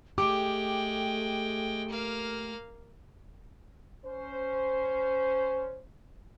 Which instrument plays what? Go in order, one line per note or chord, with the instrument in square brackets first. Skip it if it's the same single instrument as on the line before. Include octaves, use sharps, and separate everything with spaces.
[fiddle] G#3 G5 [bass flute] A3 [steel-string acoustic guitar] G4 [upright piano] D6
[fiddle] A#3 F5
[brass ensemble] C#4 C5